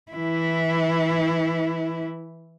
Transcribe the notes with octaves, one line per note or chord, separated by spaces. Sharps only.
E3 E4